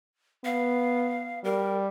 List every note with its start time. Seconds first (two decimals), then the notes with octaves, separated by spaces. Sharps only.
0.45 B3 F5
1.44 G3 A#4